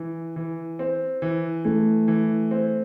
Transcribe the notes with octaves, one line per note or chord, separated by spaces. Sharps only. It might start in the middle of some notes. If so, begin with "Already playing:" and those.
Already playing: E3
E3
C4
E3
E3 A3
E3
C4